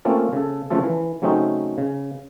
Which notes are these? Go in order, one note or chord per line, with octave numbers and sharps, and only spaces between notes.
A3 A#3 C4 C#4 F4 A4
C#3 A4
C#3 F3 A3 F4 A4
E3
C#3 F#3 A3 C4 C#4 D#4
C#3